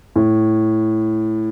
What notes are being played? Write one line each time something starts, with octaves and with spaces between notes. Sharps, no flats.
A2